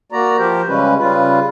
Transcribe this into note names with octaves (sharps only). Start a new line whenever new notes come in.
A#3 F#4 D5 A#5
F3 G4 A#4 C5
C#3 G3 G#3 C#4 B4
C#3 G3 F4 B4